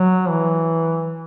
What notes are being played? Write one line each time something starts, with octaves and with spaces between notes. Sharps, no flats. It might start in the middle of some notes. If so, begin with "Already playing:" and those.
Already playing: F#3
E3